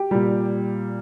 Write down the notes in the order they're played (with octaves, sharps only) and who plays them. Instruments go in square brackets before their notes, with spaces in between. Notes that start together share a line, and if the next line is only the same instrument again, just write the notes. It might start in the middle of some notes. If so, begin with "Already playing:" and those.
Already playing: [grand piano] G4
A#2 G3